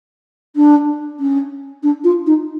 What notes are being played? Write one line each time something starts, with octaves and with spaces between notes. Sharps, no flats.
D4
C#4
D4
F4
D#4